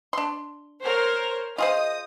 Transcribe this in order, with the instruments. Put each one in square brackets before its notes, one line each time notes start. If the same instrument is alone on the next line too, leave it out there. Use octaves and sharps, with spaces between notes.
[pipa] D4 C6
[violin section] A#4 C5 C#5
[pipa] F4 G#4 C5 [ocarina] D#5 [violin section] D#6